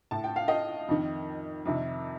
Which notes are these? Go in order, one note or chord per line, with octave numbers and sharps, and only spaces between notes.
A2 A5
G5
F5
D#5 G5
F2 D#3
F2 C3 D#3